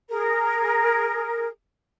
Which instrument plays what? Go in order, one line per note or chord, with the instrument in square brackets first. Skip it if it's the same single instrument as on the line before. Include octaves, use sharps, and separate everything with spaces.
[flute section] G#4 A#4